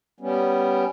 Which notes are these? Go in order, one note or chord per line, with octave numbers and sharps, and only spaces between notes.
G3 B3 C#4